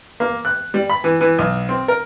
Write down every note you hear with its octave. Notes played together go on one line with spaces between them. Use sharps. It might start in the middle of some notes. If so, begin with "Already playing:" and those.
A#3
F#6
G3
B5
E3
E3
B1
C4
A#4